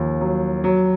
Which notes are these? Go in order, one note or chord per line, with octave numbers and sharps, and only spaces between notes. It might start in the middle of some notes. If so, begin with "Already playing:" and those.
Already playing: D#2 F3
F#3
F#3